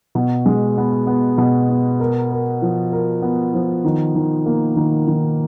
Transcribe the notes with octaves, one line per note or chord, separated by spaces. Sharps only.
B2
G#3
B3
B3
B2
B3
A#4
A#4
F3
A#4
B3
F3
D#3
D#3
A#3
D#3
D#3